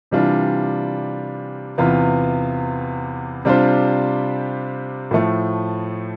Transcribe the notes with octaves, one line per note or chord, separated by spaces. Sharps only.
C3 E3 G3 D4 F4
E2 C3 E3 B3 F4
C3 G3 D4 F4 C5
A2 F3 A3